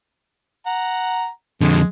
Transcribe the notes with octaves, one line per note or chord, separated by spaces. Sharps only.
F#5 A#5
F2 D3 G#3